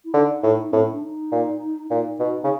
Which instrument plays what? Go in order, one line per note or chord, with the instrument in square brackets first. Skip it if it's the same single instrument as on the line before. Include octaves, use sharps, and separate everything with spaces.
[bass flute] E4
[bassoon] D3 [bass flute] D#4
[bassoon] A2
[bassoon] A2 [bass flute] C4
[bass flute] C#4
D4
D#4
[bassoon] A#2
[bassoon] A#2 [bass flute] D#4
[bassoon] B2
C#3